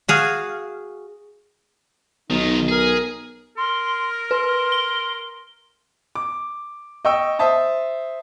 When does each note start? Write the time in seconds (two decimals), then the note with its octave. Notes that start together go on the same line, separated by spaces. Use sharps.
0.08 F#4 G#4 F5
2.30 B1 D#3 D#4 F4
2.69 G#4 A#4
3.57 A#4 C6
4.31 B4 C6
4.72 G7
6.15 D6
7.05 D#5 G5 C#6 E6
7.39 C5 E5 A5 D#6